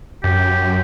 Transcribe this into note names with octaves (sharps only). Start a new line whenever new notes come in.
F#2 G4